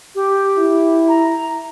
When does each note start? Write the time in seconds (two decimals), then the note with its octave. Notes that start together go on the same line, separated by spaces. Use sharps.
0.15 G4
0.58 E4
1.08 A#5